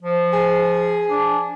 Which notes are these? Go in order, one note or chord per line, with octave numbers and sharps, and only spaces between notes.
F3
G#4
D4